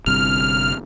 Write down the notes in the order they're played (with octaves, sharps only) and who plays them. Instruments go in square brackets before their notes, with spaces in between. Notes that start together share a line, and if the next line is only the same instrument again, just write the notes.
[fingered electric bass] G1 G2 C3 [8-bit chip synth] F6